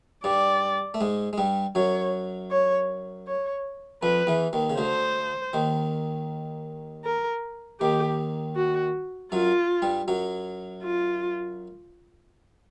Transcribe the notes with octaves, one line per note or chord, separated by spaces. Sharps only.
G2 G3 D5
A3
G#2 G#3
G#3
G2 G3
F#2 F#3 C#5
C#5
C#5
F2 F3 B4
E2 E3
D#2 D#3
C#3
D2 D3 C5
D#2 D#3
A#4
D#2 D#3 G4
F#4
F#2 F#3 F4
G2 G3
F#2 F#3
F4